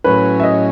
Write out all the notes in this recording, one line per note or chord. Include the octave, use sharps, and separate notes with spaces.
A2 F#3 C#4 B4
E5
D#5